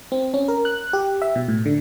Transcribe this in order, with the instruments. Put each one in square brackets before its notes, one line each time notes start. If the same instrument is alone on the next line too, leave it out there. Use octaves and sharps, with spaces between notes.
[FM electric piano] C4
C#4
A#4
F#6
G4
E5
B2
A2
D3